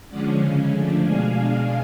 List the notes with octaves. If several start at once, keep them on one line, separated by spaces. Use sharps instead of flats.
D3 F3 G#3 C#4 D5 F#5
C#3 G#3 C#4 F5 G#5
D3 F3 A3 D4
B2 G#3 D4 F5 G#5